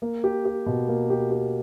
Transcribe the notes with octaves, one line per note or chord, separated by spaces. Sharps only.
A#3
G4
G4
B2
A#3
G4
G4